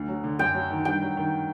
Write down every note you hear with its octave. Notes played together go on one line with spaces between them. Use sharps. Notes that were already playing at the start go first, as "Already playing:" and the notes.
Already playing: D2
F#3
D3
F#2 G5
F#3
D#3
G2 G5
F#3
D#3